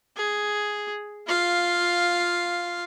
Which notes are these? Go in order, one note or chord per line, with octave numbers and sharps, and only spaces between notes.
G#4
F4 F5